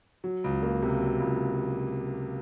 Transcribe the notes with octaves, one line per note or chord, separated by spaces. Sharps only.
F#3
C#2
A#3
C3
F#3
C#2